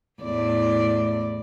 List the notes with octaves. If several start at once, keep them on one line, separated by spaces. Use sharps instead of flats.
E2 A2 D5